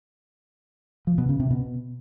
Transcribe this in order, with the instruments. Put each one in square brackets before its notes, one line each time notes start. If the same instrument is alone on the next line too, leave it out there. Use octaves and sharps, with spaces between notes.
[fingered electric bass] F3
B2
C#3
C3
B2